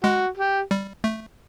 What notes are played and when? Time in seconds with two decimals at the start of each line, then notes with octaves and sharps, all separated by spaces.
0.04 G#3 F#4
0.37 G4
0.71 G3
1.04 A3